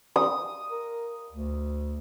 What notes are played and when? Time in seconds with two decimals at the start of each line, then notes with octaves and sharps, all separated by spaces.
0.16 D#6
0.70 A#4
1.32 D2